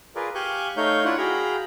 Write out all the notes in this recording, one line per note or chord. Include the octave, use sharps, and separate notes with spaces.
F4 G#4 A#4 B4 D5
G4 F5 G#5 C#6 F#6 G6
A3 D#4 C#5 F5 G6
D4 E4 F4 C#5 F#5
F#4 G#4 F5 G5 A#5 B5